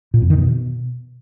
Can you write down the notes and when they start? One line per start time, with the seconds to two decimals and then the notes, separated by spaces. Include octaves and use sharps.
0.14 A#2
0.22 F2
0.30 D#3
0.38 B2